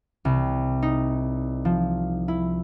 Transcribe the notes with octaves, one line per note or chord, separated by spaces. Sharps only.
C2
D#4
F3
E4